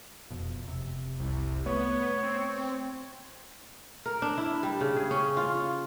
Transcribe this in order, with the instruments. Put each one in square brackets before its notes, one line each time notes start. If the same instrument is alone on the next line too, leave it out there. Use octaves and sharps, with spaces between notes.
[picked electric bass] E1 F2 B2
F1 C3
[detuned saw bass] C2
[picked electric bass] A3 [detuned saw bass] B3 [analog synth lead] C#5
[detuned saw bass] C4
[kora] A#4
D4
E4
G3
C#3
G#4
C#4
F4